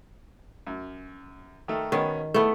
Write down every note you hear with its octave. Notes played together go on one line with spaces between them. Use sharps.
F#2
D#3 A3
B2 D#3 B3 C#4
A3 B3 E4 A4